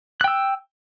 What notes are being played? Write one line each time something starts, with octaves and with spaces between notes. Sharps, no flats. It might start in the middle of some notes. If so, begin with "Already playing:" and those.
G5 E6 F#6